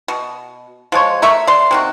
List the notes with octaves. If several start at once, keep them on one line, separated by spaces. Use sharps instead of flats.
B2
F3 G#3 C#5
A3 A#4 E5 C#6
D5 C6
C3 D#3 F#4